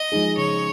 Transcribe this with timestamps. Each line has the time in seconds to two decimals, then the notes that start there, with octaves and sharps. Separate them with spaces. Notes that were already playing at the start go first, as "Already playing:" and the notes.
Already playing: D#5
0.12 F3 G#3 D#4 G#4
0.38 C#3 C#5